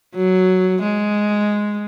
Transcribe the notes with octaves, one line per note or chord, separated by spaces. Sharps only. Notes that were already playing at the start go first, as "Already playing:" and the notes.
F#3
G#3